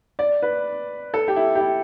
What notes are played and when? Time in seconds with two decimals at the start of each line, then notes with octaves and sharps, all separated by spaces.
0.19 D5
0.42 B4
1.14 A4
1.28 G4
1.36 E4
1.55 G4
1.60 E4